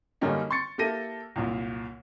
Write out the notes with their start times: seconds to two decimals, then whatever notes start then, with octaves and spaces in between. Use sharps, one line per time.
0.21 F#2 D3 G3 A#3 C#4 D#4
0.51 C6 C#6 A6 C#7
0.78 A#3 E4 G4 A4 A#6 D#7
1.36 C2 F#2 A#2